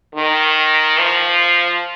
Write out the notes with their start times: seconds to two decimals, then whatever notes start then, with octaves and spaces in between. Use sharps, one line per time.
0.15 D#3
0.99 F3